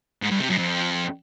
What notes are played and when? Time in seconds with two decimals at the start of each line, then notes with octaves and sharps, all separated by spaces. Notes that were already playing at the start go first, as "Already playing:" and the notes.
0.22 G#2
0.31 G2
0.40 C3
0.49 F#2
0.58 F2